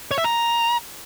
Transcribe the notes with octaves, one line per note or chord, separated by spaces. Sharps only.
C#5
E5
A#5